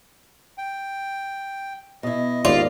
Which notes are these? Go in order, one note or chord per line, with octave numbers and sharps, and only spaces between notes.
G5
B2 E4 D#5
D#2 G#2 F4 D5